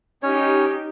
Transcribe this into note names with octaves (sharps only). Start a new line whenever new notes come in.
C#4 D#4 G4 C#5